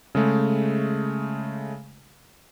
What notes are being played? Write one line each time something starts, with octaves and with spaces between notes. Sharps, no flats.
C#3 G#3 A3